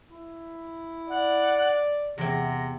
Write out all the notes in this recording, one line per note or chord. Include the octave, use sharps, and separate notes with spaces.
E4
D5 F#5
E2 C3 C4 A#6